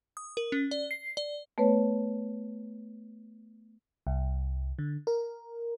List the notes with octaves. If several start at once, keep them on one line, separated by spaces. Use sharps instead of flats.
D#6
A#4
C#4
D5
C7
D5
A3 B3 B4 C#5
C2
D3
A#4